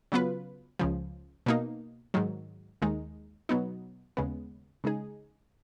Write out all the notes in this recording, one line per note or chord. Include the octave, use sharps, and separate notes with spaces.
C#3 F#3 B3 F4 B4
C#2 C#3 F3
B2 A#3 D#4
G#2 D#3 F#3
D#2 D#3 G#3 D#4
B2 F#3 B3 D#4
D#2 C#3 G#3 B3
C#3 G#3 D#4 G#4